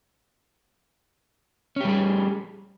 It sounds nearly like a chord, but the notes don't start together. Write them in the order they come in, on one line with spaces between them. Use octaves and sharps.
C#4 G4 G3 G#4